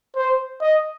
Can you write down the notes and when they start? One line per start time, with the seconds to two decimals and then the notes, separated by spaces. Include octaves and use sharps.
0.16 C5
0.61 D#5